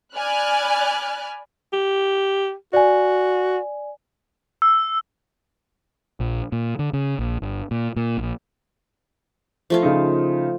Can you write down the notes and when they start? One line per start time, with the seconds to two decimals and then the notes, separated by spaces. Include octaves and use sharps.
0.15 D5 G#5 B5 F6 F#6
1.73 G4
2.73 F#4 D5 G#5
4.62 E6
6.20 A#1
6.52 A#2
6.79 D3
6.93 C#3
7.19 A#1
7.42 G1
7.71 A#2
7.96 A#2
8.17 A#1
9.70 F3 A3 F4
9.83 C#3 D#4